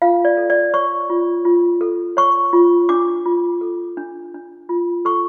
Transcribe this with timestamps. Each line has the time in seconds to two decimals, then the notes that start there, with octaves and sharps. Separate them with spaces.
0.02 F4 F5
0.25 D5
0.37 A4
0.50 D5
0.74 C#5 C#6
1.10 F4
1.45 F4
1.81 A4
2.17 C#5 C#6
2.53 F4
2.89 D4 D6
3.26 F4
3.61 A4
3.97 D4
4.34 D4
4.69 F4
5.05 A4 C#6